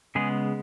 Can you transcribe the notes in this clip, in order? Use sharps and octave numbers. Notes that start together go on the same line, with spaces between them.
C#3 G#3 B3 G#4